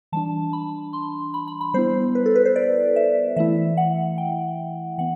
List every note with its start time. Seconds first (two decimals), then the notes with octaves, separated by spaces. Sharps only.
0.12 E3 G3 D4 A5
0.53 B5
0.93 C6
1.34 B5
1.47 B5
1.61 B5
1.74 G3 B3 E4 C5
2.15 B4
2.26 A4
2.35 B4
2.45 C5
2.56 D5
2.96 E5
3.36 E3 A3 E4 E5
3.77 F#5
4.18 G5
4.98 E3 B3 F#5